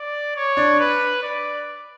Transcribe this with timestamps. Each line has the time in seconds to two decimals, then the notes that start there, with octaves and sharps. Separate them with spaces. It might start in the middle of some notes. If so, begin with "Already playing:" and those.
Already playing: D5
0.35 C#5
0.57 D4
0.79 B4
1.22 D5